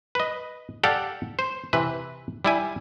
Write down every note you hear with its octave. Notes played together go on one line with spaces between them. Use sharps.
B4 D#5
G4 A4 D5 F5 F#5
C5
C3 E3 B4
G3 E4 G#5